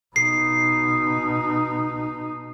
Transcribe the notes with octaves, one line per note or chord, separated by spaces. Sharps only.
B2 D#4 C7